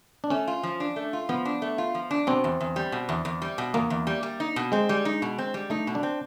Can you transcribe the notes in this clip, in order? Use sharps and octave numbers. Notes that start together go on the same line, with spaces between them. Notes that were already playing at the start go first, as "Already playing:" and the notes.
D4
A3 C#4
F4
F3
D4
A3
F4
F3 B3
D4
A3
F4
F3
D4
B2 C4
E2
E2
G3
B2
E2
E2
G3
B2
E2 A#3
E2
G3
G3
D#4
B2
G#3 C4
G3
D#4
B2
C4
G3
A3 D#4
B2
D4
C4